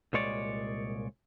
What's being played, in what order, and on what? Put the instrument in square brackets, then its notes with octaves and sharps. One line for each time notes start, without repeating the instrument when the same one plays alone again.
[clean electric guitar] C2 A#2 G#3 C#5 D5